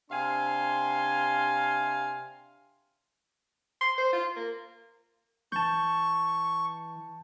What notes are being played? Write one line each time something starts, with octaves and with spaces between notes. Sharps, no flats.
C3 D4 F5 G#5 C6
C6
C5
F4
A#3
E3 A5 C#6 G6